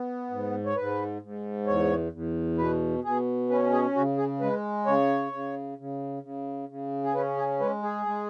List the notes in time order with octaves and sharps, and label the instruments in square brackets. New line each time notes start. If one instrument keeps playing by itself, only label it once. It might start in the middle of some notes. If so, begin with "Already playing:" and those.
Already playing: [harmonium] B3
G#2
C#5
G#2 B4
G#2
E2 C#5
E2
B2 B4
B2 G#4
C#4 B4
G#4
C#3 F#4
G#4
G#3 B4
C#3 C#5
C#3
C#3
C#3
C#3
G#4
C#4 B4
G#4
G#3 B4
G#4
G#3